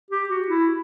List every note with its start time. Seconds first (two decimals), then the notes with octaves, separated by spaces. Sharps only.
0.11 G4
0.29 F#4
0.48 E4